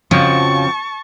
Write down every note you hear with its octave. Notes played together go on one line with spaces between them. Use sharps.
F2 C#3 F3 F#4 C#5 A5 C#6